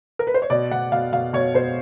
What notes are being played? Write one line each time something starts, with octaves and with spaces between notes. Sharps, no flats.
A#4
B4
C5
C#5
B2 D5
B2 F#5
B2 F5
B2 F5
B2 C#5
B2 C5